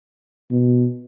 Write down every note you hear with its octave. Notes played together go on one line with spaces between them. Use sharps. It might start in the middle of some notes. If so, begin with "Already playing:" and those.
B2